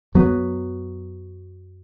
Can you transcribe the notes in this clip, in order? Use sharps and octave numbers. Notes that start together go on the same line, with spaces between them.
F#2 F#3 B3